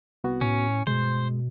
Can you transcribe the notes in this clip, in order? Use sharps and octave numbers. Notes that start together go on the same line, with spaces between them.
C2 B3 F#4
A2 C#4
G2 B2 G#3 C5